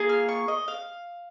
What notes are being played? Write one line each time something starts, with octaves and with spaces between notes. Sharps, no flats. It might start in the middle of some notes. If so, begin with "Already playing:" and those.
Already playing: A#3 F4 G#4
F6
C#6
D#5
F5